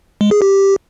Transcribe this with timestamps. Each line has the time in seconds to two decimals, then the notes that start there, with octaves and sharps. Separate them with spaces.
0.21 G#3
0.31 G#4
0.42 G4